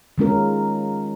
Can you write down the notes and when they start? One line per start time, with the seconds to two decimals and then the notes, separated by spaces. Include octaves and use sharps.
0.18 D#3 G#3 C#4 F4 A#4